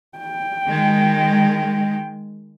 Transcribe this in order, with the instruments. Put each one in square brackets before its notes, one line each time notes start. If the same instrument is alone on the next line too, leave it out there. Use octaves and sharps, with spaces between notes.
[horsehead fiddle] G5
[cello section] D#3 G#3